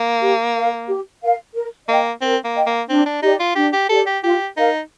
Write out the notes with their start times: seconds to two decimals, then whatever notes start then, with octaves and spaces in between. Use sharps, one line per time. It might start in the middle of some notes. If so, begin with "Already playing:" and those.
Already playing: A#3
0.21 G4
0.55 A#4 F5
0.87 G4
1.22 A#4 F5
1.55 A#4
1.88 A#3 D#5 G5
2.22 C4 A#4
2.44 A#3
2.55 D#5 G5
2.66 A#3
2.89 C4 D4
3.06 D4
3.22 D#4 G4 D5
3.40 F4
3.56 D4 G4
3.73 G4
3.89 G4 A4 D5
4.07 G4
4.23 F4 G4
4.57 D#4 A#4 F5